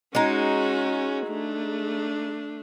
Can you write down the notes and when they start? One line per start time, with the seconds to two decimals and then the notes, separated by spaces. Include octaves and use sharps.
0.15 G#3 C#4 D#4 F#4
1.27 A3 D4